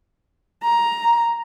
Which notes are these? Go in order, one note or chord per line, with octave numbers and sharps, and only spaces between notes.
A#5